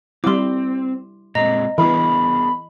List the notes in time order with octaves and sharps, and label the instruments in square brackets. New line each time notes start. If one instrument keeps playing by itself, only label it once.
[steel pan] G3 E4 [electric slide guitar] C4 [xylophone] C6 D6
[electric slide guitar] A#2 G#3 C4 [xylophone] D#5 A#5
[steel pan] E3 [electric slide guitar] B3 G#4 A#4 [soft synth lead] B5